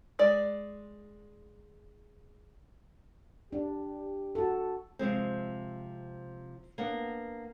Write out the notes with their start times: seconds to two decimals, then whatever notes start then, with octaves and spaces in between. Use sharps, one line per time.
0.19 G#3 D5
3.53 D4 G4
4.35 F#4 A4
4.99 C3 F3 G#3 C4
6.78 A#3 B3 D4